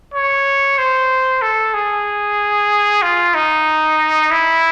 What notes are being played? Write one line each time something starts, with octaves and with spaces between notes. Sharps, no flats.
C#5
C5
A4
G#4
F4
D#4
E4